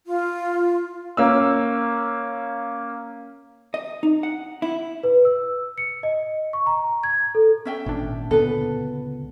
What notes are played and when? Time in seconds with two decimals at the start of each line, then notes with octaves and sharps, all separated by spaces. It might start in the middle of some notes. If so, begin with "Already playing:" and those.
0.06 F4
1.17 A#3 C#4 E6
3.74 D#5
4.03 D#4
4.23 F#5
4.62 E4
5.03 B4
5.25 E6
5.78 C#7
6.03 D#5
6.53 C#6
6.66 A#5
7.03 G#6
7.35 A4
7.65 C#4 E5 G5
7.86 G#1 A#2 D4
8.31 C#2 D3 B3 A4 B4